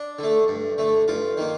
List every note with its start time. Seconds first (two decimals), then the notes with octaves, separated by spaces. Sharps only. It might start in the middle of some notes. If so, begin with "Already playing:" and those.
Already playing: D4
0.19 D3 A3
0.48 G2
0.78 D3 A3
1.08 G2 F4
1.38 D#3 A#3